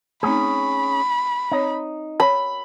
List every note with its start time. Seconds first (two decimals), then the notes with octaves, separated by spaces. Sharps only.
0.23 A3 C4 C#4 D#4 G#4 B5
1.52 C4 D#4 C#5
2.20 C#5 B5